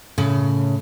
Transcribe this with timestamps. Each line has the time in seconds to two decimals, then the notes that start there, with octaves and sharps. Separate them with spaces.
0.18 A2 C#3